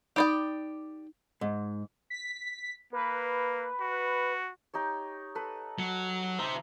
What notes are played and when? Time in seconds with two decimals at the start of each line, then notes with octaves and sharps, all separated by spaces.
0.16 D#4 G4 D5 G5 B5 D#6
1.41 G#2
2.10 B6
2.93 A#3 B4
3.80 F#4
4.74 D#4 G4 C#5
5.35 A4 B4
5.79 F#3
6.39 D#4 C5 E5